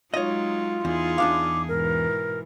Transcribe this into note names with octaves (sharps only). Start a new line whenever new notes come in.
F#3 G#3 D#4 F4 C#5 D#5
E2 D#4 E4 G#4
E2 D4 F5 D6
G#2 B2 E3 A#4